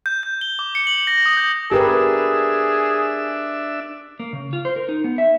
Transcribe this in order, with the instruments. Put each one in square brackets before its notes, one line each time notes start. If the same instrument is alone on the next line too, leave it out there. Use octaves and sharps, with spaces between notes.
[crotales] G6
G6
G7
D6
C#7
F#7
A#6
D#6
G6
[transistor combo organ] D4 E5 [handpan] G4 A#4 B4 [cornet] G#4
[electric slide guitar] A#3
C#3
F4
C5
A#4
D#4
B3
E5